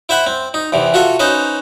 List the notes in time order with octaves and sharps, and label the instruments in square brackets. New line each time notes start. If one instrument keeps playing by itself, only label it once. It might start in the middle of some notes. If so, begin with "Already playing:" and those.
[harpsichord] E4 C5 E5 F#5 B5
C4
D#4
E2 C3 E3
F4 F#4 A4 E5
C#4 D#4 B4 C5